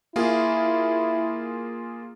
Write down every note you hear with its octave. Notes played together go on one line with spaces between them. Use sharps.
A#3 E4 F4 G#4